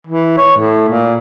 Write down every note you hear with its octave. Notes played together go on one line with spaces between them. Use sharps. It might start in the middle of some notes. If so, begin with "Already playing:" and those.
E3
C#5
A2
A#2